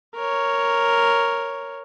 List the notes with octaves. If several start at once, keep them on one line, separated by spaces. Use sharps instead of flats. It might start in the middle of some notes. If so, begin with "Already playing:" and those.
A#4 C#5